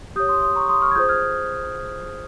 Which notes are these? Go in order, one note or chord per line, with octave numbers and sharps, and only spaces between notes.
G4 C#5 D#6 G6
C6 D#6
C6 D#6
A#5 C#6
C6 D#6
C#6 F6
G#6
F4 G#4 C5 D#6 G6
F6 G#6